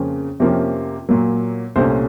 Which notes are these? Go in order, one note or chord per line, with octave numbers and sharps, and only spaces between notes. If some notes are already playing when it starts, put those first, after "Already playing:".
Already playing: F2 C#3 F3 A#3 C#4
F2 C3 F3 A#3 C#4
A#2 F#3 A#3
C2 A#2 A3 C#4 C5